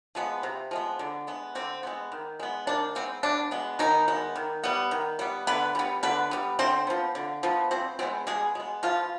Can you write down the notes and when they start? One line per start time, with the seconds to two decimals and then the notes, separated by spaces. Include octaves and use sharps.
0.15 F3 G#3 B3
0.43 C3
0.71 F3 G#3 B3
0.99 D3
1.27 G#3 B3
1.55 D3 C4
1.83 G#3 B3
2.12 D#3
2.40 G#3 B3
2.67 D#3 D4
2.95 G#3 B3 C4
3.23 B2 D4
3.51 G#3 B3
3.79 B2 D#3 D#4
4.08 G#3 B3
4.36 D#3
4.64 G3 B3
4.91 D#3
5.19 G3 B3
5.47 D3 B3 B4
5.75 G3 B3
6.03 D3 B3 B4
6.31 G3 B3
6.59 D3 C4 C5
6.87 F3 B3
7.15 D3
7.43 F3 B3
7.71 B2 C4 C5
7.99 G#3 B3 C4 C5
8.27 B2 G#3 G#4
8.55 G#3 B3
8.83 B2 F3 F4